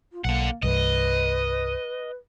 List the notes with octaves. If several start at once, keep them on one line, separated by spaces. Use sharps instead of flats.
F4
B1 D3 A#3 F#5
C2 G2 B4 D#5